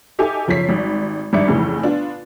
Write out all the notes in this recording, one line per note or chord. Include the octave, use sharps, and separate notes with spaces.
D#4 G4 A4 E5 G#5 D6
F#1 F3 C#5 B6 C7
G#1 G3
G#1 G2 G3 E5 D6 C#7
F2 A2 C#3 E3
B3 D4 F4